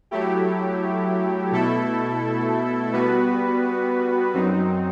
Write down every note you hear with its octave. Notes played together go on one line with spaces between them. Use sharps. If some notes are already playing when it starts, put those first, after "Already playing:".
F#3 A3 E4 G4
B2 A3 E4 A4
G3 B3 F#4 B4
F#2 F#3 C4 D#4